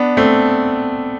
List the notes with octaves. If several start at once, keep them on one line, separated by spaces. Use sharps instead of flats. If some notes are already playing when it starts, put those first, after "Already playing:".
Already playing: B3 D4
A3 C4